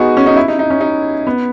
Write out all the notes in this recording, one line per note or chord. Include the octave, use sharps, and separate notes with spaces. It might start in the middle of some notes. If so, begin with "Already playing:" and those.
Already playing: B3 D#4 F#4 G#4
C#4
D#4
E4
D#4
D#4
C#4
D#4
B3